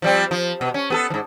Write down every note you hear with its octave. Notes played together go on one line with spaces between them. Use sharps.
F3 G3 C4
F3
B2
C#4
B3 G#4 A4
G#2 E3